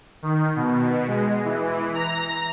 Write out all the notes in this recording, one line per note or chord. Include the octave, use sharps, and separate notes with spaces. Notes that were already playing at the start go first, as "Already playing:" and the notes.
D#3
B2
G#3
E3
A#5